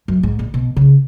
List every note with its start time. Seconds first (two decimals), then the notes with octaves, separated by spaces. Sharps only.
0.08 F#2
0.23 G#2
0.39 A#2
0.54 B2
0.77 C#3